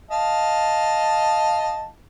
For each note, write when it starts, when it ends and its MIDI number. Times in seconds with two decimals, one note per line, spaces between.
0.11 1.86 75
0.11 1.86 77
0.11 1.86 81